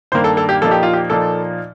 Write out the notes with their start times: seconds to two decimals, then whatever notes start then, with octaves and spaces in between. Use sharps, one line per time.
0.12 G2 D#3 A#3 C5
0.24 A4
0.37 A4
0.49 G4
0.62 A#2 F3 A#3 D#4 A4
0.71 G4
0.83 F4
0.93 G4
1.10 A#2 F3 A#3 D#4 A4